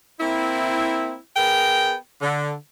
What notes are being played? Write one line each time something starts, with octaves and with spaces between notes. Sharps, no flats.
A#3 C4 E4
B3 G#4 A#4 G5
D3